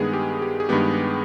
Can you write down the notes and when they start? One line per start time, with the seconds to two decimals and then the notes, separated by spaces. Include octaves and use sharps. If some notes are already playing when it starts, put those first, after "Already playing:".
Already playing: G2 D#3 G#3 B3 G#4
0.13 G4
0.42 G4
0.60 G#4
0.69 G2 D#3 G#3 B3 G4